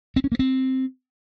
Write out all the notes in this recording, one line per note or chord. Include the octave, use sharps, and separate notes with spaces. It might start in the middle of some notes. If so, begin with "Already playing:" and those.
C4
C#4
A#3
C4